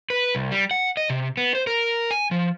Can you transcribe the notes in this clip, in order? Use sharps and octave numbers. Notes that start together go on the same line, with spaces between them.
B4
C2
G3
F#5
D#5
C3
B3
C5
A#4
G#5
F3